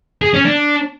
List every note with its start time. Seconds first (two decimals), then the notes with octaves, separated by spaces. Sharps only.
0.22 G#4
0.34 C#4
0.45 D4